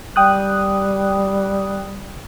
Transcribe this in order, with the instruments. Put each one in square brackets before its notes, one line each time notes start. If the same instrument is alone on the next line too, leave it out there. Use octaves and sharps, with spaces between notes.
[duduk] G3 [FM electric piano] G5 D#6 F#6